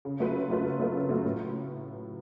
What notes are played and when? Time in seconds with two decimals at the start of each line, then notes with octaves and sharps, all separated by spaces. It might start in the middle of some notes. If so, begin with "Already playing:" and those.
0.05 C#3
0.20 F#3 A3 F4 B4
0.35 C#3
0.50 F#3 A3 F4 B4
0.64 C#3
0.79 F#3 A3 F4 B4
0.95 C#3
1.09 F#3 A3 F4 B4
1.24 A2